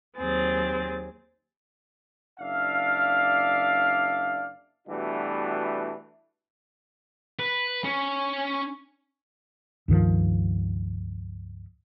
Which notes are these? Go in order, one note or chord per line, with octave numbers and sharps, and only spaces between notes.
D#2 F#3 C4 G#4 A6
F#1 D4 D5 E5 F5
B2 E3 G3 A3 D4 F#4
B4
C#4
C#2 G2 D#3 F3